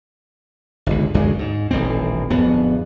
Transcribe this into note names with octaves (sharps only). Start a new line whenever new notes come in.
G1 C#2
F#1 D2 C#3 G#3
G#2
D#1 A1 D2 C4
D1 F2 B3